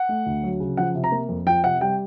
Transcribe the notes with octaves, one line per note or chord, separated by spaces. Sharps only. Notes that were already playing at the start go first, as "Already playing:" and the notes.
Already playing: F#5
A3
D2
F#3
C#3
F3 F#5
C3
A#5
A#3
F2
F3 G5
C3 F#5
G3 G5